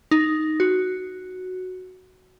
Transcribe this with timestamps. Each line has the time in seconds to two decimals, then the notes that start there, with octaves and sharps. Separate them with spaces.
0.11 D#4
0.60 F#4